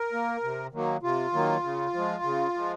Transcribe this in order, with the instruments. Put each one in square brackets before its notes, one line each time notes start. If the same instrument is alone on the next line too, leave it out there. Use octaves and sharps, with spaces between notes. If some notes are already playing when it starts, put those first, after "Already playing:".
Already playing: [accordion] A#4
A#3
C3
D#3 F#3 A#3
C3 F4
D#3 F#3 A#3
C#3
F3 G#3
C#3
F3 G#3